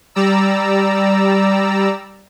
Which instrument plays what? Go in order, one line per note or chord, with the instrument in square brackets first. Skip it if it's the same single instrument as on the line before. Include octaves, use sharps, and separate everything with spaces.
[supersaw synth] G3 D5 A#5 E6